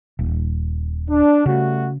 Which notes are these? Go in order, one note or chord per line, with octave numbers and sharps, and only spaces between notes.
D#1
D4
C#3 G3 A3 F#4